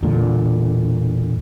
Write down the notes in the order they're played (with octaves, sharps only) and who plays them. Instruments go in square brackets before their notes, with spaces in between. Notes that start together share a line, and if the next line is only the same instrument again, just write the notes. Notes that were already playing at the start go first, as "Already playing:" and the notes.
[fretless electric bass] E1 A#2 D3